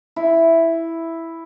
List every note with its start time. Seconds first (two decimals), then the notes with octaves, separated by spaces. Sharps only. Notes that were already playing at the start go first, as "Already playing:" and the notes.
0.16 E4